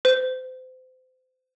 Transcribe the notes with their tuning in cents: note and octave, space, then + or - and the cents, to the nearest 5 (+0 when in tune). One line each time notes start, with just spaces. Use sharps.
C5 -30